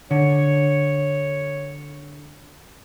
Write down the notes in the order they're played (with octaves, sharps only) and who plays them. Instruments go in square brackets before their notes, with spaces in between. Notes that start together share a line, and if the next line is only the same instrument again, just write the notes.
[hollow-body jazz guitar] D3 [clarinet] C#5